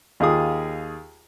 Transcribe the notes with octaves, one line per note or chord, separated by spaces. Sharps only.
D#2 F4 G#4 D#6